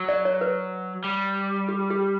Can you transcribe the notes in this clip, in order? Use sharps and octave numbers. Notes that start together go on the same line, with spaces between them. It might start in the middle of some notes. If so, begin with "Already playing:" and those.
Already playing: F#3
D5
C#5
B4
G3
G4
G4